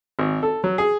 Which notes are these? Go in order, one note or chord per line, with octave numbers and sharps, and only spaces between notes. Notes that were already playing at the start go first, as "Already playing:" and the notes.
G#1
A4
F#3
G#4